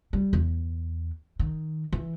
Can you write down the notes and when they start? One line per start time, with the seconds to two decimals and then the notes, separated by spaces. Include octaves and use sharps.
0.13 G3
0.33 E2
1.39 D#3
1.92 E3